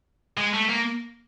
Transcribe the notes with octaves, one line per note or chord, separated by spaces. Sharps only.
G#3
A3
A#3